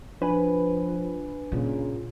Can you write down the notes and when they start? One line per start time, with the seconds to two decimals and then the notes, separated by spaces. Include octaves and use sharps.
0.22 F3 D4 B4 G#5
1.52 A#2 C#3